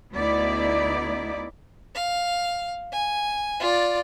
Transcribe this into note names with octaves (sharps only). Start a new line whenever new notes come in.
D2 B3 D#4 E4 D5
F5
G#5
F4 D5